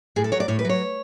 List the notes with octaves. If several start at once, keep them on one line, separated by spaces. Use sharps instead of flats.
A2 G#4
A4
F#3 C#5
D5
A2 C#5
B4
F#3 C#5